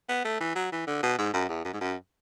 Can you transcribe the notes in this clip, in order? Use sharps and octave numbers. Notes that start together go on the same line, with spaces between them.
B3
A3
E3
F#3
E3
D3
B2
G#2
F#2
E2
F#2
G#2
F#2